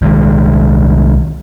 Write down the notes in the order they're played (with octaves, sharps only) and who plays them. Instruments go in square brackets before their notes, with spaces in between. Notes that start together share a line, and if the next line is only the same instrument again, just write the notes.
[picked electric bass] C2 D#3 F3 G#3